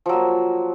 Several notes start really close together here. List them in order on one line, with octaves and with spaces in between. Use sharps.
F3 F#3 A#3